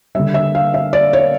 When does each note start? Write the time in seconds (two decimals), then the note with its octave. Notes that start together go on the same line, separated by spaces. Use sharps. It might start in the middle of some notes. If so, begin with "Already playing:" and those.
0.15 D3 G3 E5
0.34 E5
0.55 F5
0.74 E5
0.93 D5
1.13 C#5